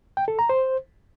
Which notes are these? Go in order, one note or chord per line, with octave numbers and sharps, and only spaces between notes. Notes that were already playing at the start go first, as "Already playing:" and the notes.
G5
A4
A#5
C5